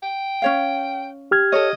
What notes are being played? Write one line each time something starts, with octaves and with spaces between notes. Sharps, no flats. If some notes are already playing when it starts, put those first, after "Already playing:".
G5
C#4 C#5 F5
G4 F6 G#6
A4 C#5 D#5